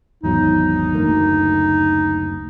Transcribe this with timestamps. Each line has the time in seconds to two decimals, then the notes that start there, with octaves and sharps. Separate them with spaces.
0.23 G#1 E2 F#3 D#4
0.95 F#1 D2 A#3